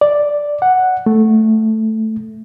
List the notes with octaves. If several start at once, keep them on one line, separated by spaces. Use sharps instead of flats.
D5
F#5
A3